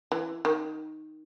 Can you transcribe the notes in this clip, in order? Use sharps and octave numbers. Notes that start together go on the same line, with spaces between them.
E3
D#3